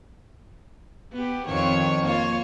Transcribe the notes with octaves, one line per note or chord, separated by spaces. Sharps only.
B3 G4
F2 D#3 C#5
A#3 F4 C#5